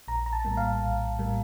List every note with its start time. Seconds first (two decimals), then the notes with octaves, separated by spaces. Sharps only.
0.08 A#1 A#5
0.26 A#5
0.33 A5
0.45 A2 G3 A#3
0.57 F5
0.82 A#1
1.19 A2 G3 A#3